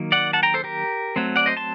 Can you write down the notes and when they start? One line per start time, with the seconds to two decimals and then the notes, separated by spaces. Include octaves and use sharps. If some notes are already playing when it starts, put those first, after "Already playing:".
Already playing: D#3 F#3 A#3
0.12 D5 F#5
0.33 F#5 A5
0.43 G5 A#5
0.54 A4 C5
0.64 G4 A#4
1.16 F#3 A3 C4
1.36 D5 F#5
1.46 C5 D#5
1.57 A5 C6